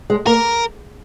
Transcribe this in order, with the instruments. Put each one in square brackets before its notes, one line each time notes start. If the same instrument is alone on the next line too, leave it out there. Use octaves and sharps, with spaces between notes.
[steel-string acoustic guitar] G#3
[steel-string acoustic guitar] A#3 [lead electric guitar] A#4